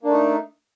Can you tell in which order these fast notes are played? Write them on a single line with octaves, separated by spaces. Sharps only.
A#3 D4 A3 D#4